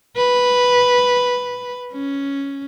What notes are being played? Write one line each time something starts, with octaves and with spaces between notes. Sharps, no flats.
B4
C#4